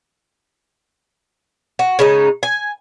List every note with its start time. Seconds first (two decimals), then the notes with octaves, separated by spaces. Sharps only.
1.79 F#4
1.99 C#3 G#3 D#4
2.43 G#5